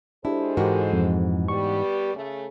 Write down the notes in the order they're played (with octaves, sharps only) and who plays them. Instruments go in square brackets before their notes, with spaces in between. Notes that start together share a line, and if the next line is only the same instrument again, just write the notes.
[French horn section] G#3 A4 C5 [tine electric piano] D4 G4 [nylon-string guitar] E4
[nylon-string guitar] G#2 E3 F#4 [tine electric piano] G4 A#4
[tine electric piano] F2 F3
[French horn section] G3 B3 G4 [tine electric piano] C#6
[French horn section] C#3 A3